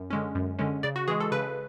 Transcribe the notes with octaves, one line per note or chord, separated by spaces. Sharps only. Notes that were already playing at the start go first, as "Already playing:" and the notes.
Already playing: F#2
D3 G#3 C#4
F#2
D3 G#3 C#4
C#3 D5
F#4
E3 G#3 G#4
A4
C#3 B4